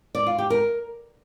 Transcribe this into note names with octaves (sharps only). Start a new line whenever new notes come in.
D5
F4
G4
A#4